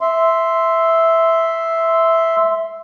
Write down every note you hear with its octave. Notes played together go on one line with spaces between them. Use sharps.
E5 C6